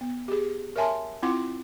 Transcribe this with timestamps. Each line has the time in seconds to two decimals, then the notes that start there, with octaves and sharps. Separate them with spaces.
0.01 B3
0.28 G4 G#4
0.76 A#4 C#5 E5 G#5 A5 C6
1.23 C4 E4 F4 F#5 C6 D6